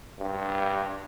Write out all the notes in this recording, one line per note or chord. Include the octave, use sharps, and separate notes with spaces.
G2